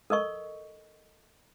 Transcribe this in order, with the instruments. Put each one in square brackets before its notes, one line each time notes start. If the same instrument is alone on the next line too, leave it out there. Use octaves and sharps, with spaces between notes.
[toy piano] A4 A#4 D#5 C#6